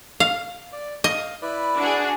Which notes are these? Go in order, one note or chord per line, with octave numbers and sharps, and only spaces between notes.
F5
D5
D#5 F5
E4 B4 D5
D4 F#4 G#4